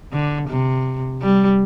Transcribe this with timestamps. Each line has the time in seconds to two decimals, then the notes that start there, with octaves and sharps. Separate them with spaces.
0.13 D3
0.49 C3
1.22 G3